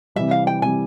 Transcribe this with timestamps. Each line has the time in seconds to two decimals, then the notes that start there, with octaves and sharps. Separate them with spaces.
0.16 C3 E3 G3 E5
0.31 F5
0.47 G5
0.62 C3 E3 G3 G#5